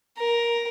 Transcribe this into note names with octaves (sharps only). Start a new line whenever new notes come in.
A#4